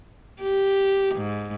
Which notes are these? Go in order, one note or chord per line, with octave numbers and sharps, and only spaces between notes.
G4
G#2